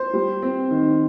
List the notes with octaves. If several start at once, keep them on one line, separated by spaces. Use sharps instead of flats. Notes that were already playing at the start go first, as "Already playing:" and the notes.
Already playing: C5
G3
C4
D#3